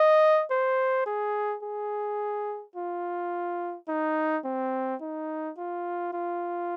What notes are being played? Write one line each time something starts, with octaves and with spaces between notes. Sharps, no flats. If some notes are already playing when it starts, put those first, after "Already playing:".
Already playing: D#5
C5
G#4
G#4
F4
D#4
C4
D#4
F4
F4